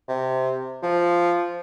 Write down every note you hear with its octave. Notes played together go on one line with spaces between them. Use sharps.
C3
F3